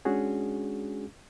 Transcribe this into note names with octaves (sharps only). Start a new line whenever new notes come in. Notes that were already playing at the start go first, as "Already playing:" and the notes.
G#3 C#4 D4 F#4 G#4